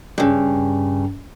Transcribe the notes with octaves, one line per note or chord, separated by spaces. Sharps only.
G2 C#3